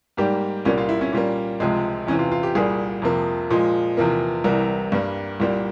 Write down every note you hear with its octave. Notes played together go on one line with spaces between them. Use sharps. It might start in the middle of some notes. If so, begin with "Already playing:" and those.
G#2 G3 A#3 G4
C2 A#2 G3 A#3 C#4
F4
E4
C#4
A#2 G3 A#3
C#2 C3 F3 G#3
E2 C3 E3 C#4
F4
F4
G4
C2 A#2 G3 A#3 G#4
F2 C3 F3 A#3
A#2 F3 G#3
E2 C3 F3 A#3
C2 C3 E3 G3 A#4
G2 G3 A#3
C2 A#2 G3 A#3